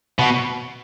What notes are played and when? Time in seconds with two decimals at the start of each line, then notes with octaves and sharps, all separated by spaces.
0.19 B2